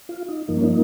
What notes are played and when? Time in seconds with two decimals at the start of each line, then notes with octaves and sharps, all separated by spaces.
0.09 F4
0.28 D#4
0.48 G2 F3 A#3 D#4
0.57 C#4
0.64 D#4